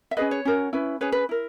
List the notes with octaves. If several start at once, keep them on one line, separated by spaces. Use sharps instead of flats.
E5
C#4 G#4 B4 D#5
C#5
C#4 F#4 A#4
C#4 E4 B4
C#4 G#4 B4 C#5
B4
E4 A#4